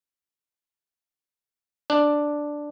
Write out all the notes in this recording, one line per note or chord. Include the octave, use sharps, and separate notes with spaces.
D4